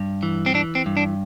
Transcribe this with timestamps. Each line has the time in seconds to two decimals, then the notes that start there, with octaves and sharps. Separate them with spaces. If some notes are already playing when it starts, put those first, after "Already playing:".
Already playing: G2
0.23 E3
0.46 C4
0.54 E3 D4
0.75 C4
0.86 G2
0.97 D4